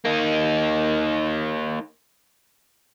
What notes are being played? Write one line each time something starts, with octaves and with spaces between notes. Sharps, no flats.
A#3 D#4